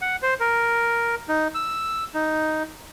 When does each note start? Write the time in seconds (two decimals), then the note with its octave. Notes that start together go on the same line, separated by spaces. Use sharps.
0.01 F#5
0.22 C5
0.40 A#4
1.29 D#4
1.55 E6
2.14 D#4